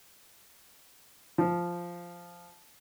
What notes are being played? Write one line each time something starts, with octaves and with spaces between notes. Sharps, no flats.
F3